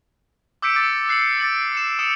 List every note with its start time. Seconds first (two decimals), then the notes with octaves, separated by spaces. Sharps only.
0.62 D6 E6 G6 B6 C#7 D7
0.76 D6 E6 A6 C#7 D7
1.09 F#6 C7 C#7 F#7
1.40 D6 A6 D7 F#7
1.74 C#7 E7
1.99 D#6 E6 C#7 E7